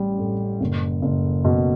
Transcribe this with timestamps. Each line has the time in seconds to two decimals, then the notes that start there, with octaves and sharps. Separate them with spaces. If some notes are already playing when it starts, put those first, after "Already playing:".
Already playing: A1 G3 C#4
0.19 A2
0.60 F#1
1.02 F#1
1.44 B2